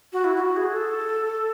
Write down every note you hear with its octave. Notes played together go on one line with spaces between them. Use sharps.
F#4
E4
E4
F#4
G#4
A4